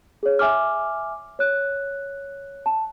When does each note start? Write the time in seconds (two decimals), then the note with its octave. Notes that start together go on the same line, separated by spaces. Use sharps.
0.23 G#4 C#5
0.39 E5 G#5 D6 F6
1.39 C#5 F#6
2.66 A5